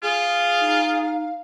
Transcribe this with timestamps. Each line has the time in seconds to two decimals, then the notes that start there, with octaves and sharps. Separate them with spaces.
0.03 F4 G#4 F5
0.61 D#4